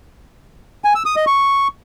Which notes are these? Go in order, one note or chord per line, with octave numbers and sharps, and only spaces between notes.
G#5
E6
D#6
D#5
C#6